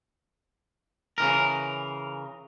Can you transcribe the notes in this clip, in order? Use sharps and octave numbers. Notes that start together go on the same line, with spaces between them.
C#3 E3 A#4